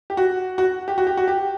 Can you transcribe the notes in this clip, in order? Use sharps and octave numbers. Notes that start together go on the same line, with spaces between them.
G4
F#4
F#4
G4
F#4
G4
F#4
G4